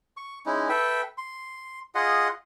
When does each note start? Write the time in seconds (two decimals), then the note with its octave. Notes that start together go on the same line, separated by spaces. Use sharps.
0.17 C#6
0.46 G#3 C#4 D#4 E4
0.69 A4 B4 E5 G5
1.18 C6
1.95 F4 G#4 D#5 F#5